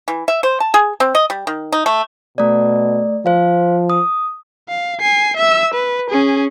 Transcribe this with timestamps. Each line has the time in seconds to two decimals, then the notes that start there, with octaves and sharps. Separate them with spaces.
0.08 E3
0.28 E5
0.43 C5
0.60 A5
0.74 G#4
1.00 C4
1.15 D#5
1.30 G3
1.47 D#3
1.72 D#4
1.86 A3
2.38 B2 A3 D5
3.26 F3 C5 F5
3.90 D#6
4.69 F5
5.01 G#5 C7
5.37 E5 E6
5.74 B4
6.10 C#4 G#4